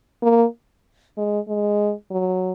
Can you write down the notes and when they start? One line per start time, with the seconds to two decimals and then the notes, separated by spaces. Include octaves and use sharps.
0.23 A#3
1.17 G#3
1.48 G#3
2.11 F#3